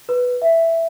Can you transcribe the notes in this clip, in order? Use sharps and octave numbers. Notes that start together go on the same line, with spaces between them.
B4
E5